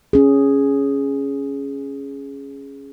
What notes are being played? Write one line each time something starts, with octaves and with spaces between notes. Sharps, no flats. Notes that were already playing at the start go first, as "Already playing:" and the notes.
C#4 G#4